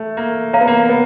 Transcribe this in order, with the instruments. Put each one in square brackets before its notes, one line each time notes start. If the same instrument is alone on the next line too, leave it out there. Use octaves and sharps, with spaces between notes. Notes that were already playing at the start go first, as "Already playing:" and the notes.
Already playing: [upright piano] A3
A#3
[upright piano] A#3 [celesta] C#5 F5 A#5
[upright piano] B3
A#3
B3